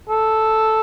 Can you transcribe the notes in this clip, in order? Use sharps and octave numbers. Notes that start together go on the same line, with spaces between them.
A4